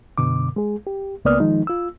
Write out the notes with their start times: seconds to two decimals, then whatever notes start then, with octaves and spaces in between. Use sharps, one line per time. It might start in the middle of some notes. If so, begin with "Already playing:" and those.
0.18 F#2 B2 D3 D6
0.56 G#3 G#4
0.87 G4
1.25 C#2 A#3 B3 D5 D#6 F6
1.40 D#3 F3 G#3 D#4
1.67 F4 E6